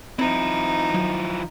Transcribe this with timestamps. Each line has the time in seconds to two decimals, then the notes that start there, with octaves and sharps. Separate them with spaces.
0.19 F3 C4 D#4 E4
0.94 F#3